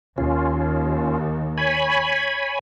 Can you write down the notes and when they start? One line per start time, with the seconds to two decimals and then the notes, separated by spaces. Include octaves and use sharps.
0.18 D#2 C#4 F4
1.58 C#5 G#5 B5